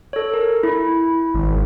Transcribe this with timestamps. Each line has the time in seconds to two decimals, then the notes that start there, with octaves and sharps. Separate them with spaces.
0.13 A4 C#5
0.34 A#4
0.63 E4
1.34 G#1